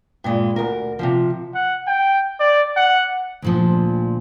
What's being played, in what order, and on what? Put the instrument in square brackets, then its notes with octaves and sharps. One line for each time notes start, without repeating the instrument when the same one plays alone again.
[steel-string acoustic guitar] G2 A#2 G#3
D2 A#4
C3 D#3 F3
[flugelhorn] F#5
G5
D5
F#5
[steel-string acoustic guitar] D2 A#2 F3